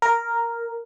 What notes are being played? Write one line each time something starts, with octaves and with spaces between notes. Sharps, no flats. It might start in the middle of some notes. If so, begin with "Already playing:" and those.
A#4